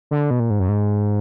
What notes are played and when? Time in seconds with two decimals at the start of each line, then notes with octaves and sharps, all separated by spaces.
0.11 D3
0.31 B2
0.40 A#2
0.50 G#2
0.60 F#2
0.69 G#2